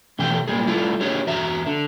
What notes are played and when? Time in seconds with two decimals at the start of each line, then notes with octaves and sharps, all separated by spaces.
0.19 B2 E3 A3 G4 G5
0.48 A#2 C#3 G3 G#4
0.67 G3 A3 E4 F4
1.01 D#4 G4 G#4 C#5
1.27 E2 F#4 E5 A#5
1.66 D3